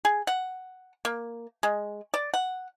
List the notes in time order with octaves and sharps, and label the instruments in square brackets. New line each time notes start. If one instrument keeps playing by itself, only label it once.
[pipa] G#4
F#5
A#3
G#3
D5
F#5